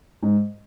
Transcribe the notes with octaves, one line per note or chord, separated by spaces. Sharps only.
G#2